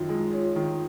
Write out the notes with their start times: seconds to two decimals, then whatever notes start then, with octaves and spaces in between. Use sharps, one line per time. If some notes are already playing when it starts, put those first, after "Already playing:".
Already playing: F#2 D#3 F4
0.09 G#3
0.33 C#4
0.56 D#3